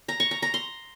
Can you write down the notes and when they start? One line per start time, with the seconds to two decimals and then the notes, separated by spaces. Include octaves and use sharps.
0.08 A#5
0.20 C#6
0.31 A#5
0.42 A#5
0.54 C6